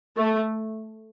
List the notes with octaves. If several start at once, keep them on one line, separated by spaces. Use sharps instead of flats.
A3